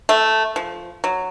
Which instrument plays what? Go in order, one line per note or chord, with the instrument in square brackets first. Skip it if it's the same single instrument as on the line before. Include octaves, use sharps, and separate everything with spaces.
[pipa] A3
F3
F#3